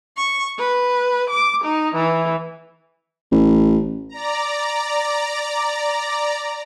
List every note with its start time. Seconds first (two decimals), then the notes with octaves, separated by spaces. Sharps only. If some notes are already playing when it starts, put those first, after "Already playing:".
0.17 C#6
0.59 B4
1.29 D6
1.63 D#4
1.95 E3
3.32 A1
4.09 D5 A#5